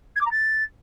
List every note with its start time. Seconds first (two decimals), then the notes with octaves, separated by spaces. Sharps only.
0.16 G#6
0.21 D6
0.26 A#5
0.31 A6